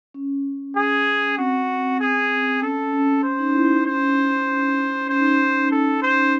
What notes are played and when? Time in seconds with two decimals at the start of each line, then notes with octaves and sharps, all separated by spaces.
0.14 C#4
0.76 G#4
1.38 C4 F#4
2.00 G#4
2.62 C#4 A4
2.93 C#4
3.23 C#4 C5
3.39 D#4
3.54 E4
3.70 D#4
3.85 C#4 C5
5.09 C#4 C5
5.20 D#4
5.31 C#4
5.71 A4
6.02 C5